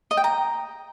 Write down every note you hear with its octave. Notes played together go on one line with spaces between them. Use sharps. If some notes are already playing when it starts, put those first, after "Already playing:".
D#5
G5
A#5